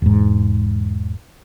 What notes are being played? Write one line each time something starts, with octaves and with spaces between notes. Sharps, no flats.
E1 G#2